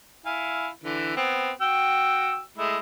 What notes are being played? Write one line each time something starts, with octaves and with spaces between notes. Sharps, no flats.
E4 F5 G#5
D3 E3
B3 C4
F#4 G5 E6
G#3 A3 E4